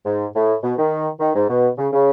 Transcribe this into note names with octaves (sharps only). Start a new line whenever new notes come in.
G#2
A2
B2
D#3
D#3
G#2
B2
C#3
C#3